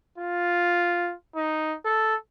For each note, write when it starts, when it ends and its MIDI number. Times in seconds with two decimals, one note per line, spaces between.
0.18 1.13 65
1.36 1.75 63
1.85 2.15 69